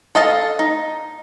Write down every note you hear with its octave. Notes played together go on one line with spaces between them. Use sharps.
A4 D#5 F5 A5
D#4